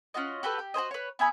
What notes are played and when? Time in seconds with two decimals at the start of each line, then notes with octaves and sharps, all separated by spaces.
0.14 C#4 F4 F#4 D#5
0.43 F#4 G4 A4 B4
0.59 G4
0.74 F#4 G#4 C5 D#5
0.91 B4 C#5
1.19 B3 E5 G#5 B5